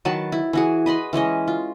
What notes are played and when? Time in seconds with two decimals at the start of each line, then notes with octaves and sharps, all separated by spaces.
0.05 D#3 F#3 B4 A5
0.32 E4
0.53 E3 F#4 G#4
0.86 B4 D#5 B5 C6
1.13 E3 G#3 C#4 D#5
1.48 F4